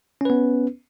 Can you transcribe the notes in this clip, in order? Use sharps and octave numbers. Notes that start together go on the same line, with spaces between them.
B3 C#4 B4